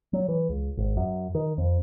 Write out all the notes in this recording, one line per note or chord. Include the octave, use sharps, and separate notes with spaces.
F#3
E3
C#2
G#1
F#2
D#3
F2